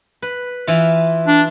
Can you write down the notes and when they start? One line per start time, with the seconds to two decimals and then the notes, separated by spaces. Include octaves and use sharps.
0.22 B4
0.67 E3 F4
1.27 D4